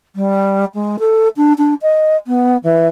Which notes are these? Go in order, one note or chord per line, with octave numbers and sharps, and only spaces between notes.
G3
G#3
A4
D4
D4
D#5
B3
E3